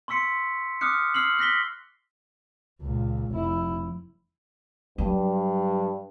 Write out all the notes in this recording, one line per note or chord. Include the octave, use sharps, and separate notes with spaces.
C6 C#6 E6 B6 C#7
D6 D#6 F6 F#6 C#7
E6 F6 C7 F#7
F#6 A#6 B6 G7
C#2 A#2
F1 E4
G2 F#3